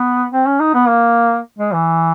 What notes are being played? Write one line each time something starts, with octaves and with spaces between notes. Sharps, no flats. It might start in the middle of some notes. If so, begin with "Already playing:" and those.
Already playing: B3
C4
C#4
D#4
B3
A#3
G#3
E3